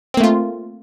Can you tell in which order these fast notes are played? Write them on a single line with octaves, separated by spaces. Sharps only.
C4 A#3 A3 F4